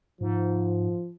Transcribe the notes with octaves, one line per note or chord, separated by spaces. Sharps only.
G#2 F3